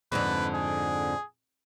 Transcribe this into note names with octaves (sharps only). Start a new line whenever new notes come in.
F2 G#2 D3 B4
G#4